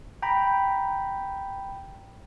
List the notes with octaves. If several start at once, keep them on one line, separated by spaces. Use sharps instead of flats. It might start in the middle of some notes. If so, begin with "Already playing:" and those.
G5 A#5 B5